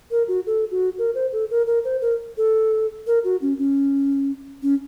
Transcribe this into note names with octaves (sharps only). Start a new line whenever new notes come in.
A#4
F#4
A4
F#4
A#4
C5
A4
A#4
A#4
C5
A#4
A4
A#4
F#4
C#4
C#4
C#4